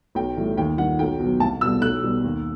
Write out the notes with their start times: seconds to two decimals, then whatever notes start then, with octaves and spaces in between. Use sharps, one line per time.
0.15 B1 G5
0.37 A2 E3 G3
0.57 D#2 G5
0.78 D#3 G3 F#5
0.99 B1 G5
1.20 B2 F#3
1.40 C2 A5
1.61 B2 G3 E6
1.81 B1 F#6
2.03 B2 G3
2.24 D#2